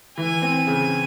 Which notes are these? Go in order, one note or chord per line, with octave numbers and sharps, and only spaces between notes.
E3 G#5
C4
C#3